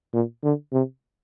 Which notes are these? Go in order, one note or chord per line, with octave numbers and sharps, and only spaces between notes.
A#2
D3
C3